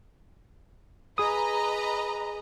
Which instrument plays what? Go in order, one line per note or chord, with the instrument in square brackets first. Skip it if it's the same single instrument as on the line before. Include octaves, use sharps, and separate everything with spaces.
[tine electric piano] G#4 D#6 [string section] B4 D#5 A#5